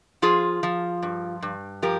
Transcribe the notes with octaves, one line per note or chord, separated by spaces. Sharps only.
F3 F4 G#4
F3
G2
G2
F3 G4 A#4